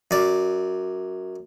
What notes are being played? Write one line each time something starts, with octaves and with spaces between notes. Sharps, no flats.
F#2 D5